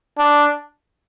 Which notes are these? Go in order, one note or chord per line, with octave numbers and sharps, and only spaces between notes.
D4